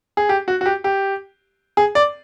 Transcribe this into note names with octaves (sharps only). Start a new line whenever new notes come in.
G#4
G4
F#4
F#4
G4
G4
G#4
D5